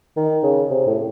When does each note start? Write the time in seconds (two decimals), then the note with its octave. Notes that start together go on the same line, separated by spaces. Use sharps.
0.17 D#3
0.43 C#3
0.70 C3
0.87 A2